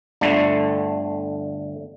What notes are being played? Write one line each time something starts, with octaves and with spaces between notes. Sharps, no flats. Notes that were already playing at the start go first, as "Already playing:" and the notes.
G1 D3 A3